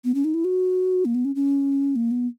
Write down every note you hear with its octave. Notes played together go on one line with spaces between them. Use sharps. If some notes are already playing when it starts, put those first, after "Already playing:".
B3
C#4
D#4
E4
F#4
A#3
B3
C#4
C#4
A#3
B3